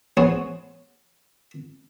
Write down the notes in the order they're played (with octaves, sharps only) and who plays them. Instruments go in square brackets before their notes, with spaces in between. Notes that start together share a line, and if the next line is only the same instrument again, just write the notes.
[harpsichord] B3 G#4 C5 C#5